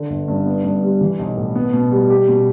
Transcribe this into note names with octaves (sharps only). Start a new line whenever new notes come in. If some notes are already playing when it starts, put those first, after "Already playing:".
Already playing: D3
G1
G2
B3
G2
G3
E3
B1
A2
B3
B2
G3
G4
B2